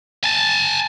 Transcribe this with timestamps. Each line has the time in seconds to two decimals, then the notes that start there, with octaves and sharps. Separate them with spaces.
0.24 G#5 A5